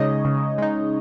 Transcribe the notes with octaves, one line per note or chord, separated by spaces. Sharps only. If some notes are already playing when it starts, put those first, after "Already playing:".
Already playing: C#3 G#3 D#4 C#5 D#5
C#3
G#3 D#4